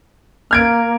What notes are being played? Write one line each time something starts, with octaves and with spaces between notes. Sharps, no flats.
A#3 F6 G#6 D7